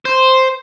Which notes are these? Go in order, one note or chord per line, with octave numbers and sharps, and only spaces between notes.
C5